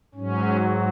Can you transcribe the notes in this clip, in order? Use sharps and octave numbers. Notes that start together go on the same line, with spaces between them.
G#2 F#3 C#4